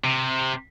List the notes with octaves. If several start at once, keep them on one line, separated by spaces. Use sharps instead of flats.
C3